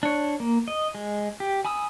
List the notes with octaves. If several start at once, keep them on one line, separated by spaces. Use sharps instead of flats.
D4 C#5
A#3
D#5
G#3
G4
G#5 B5 D#6 E6